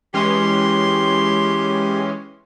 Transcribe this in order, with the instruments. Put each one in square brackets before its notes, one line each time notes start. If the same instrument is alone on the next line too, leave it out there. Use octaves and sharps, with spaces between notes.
[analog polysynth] E3 G#3 C#4 [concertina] G4 [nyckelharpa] C6